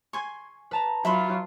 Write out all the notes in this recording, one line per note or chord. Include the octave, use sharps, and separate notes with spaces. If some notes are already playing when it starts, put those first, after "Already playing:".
G#5 C6 C#6 G#6
B4 A5 A#5
F#3 F4 E5 B5 C6